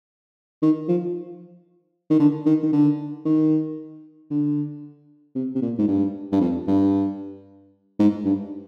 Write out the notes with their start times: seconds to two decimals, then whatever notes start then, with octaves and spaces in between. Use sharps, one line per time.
0.62 D#3
0.89 F3
2.11 D#3
2.20 D3
2.46 D#3
2.63 D#3
2.73 D3
3.25 D#3
4.30 D3
5.35 C3
5.55 C3
5.62 A#2
5.78 G#2
5.88 G2
6.32 G2
6.41 F2
6.68 G2
7.99 G#2
8.25 G2